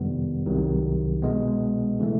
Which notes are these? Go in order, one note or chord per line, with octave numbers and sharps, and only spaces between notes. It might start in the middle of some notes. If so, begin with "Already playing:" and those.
Already playing: F2 C3 D#3 G3 B3
C2 C3 D#3 F#3
B2 G#3 B3
C#3 E3 A3